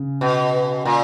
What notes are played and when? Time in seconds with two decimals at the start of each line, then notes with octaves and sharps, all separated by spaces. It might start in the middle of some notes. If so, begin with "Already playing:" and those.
Already playing: C#3
0.21 B2
0.85 A#2